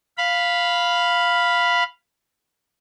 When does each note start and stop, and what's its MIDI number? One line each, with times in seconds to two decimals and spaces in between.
0.18 1.83 77
0.18 1.83 83